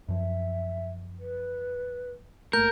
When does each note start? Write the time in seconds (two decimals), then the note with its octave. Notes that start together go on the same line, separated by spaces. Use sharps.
0.08 F#2 F3 E5
1.20 B4
2.53 G1 A3 A#3 A#4 G6